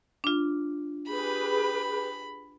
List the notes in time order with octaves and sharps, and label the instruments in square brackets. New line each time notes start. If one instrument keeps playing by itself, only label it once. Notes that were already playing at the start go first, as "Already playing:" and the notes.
[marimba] D4 F4
[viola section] G4 G#4 B4 [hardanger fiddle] B5